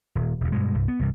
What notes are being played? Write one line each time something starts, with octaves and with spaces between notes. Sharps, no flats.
D#1
E1 D#2
G2 B2 G#3
C2 G2
B3
C2 G2 C3